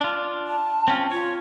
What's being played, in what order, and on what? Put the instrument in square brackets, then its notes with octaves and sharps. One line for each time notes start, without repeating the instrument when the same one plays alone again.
[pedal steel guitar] D4 F4
[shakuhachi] A5
[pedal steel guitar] C4 C#4 F4
[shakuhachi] F4 [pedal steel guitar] C#5